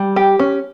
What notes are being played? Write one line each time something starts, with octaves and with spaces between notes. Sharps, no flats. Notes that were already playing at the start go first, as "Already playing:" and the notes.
Already playing: G3
G4
C#4